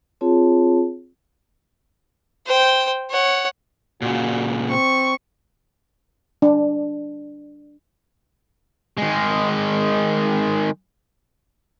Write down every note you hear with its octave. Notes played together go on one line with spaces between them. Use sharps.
C4 F4 G#4 C#5 A5
C5 G5
C#5 F#5
A#2 C#3 F#4
C4 C#6
D4
D#3 G#3